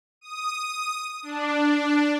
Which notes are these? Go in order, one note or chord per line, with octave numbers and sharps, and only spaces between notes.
D#6
D4